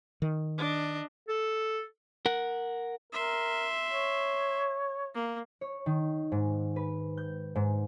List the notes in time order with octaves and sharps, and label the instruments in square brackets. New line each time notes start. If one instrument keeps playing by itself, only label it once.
[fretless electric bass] D#3
[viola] D4 D#5
[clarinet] A4
[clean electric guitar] A#4 F#5
[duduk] A#4 [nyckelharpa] E5 C6
[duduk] C#5
[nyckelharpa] A#3
[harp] C#5
D#3
G#2
B4
G6
G#2